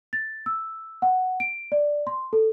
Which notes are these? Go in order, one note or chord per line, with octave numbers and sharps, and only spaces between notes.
A6
E6
F#5
D7
D5
C6
A4